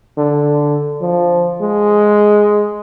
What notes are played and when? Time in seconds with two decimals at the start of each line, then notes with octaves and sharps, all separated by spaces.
0.17 D3
1.01 F3
1.61 G#3